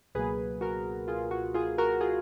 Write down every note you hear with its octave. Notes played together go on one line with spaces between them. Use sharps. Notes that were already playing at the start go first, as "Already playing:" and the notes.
C#2 B2 F#3 A#3 G#4 B4
F#4 A#4
F4 G#4
F#4
F4 G#4
F#4 A#4
F4 G#4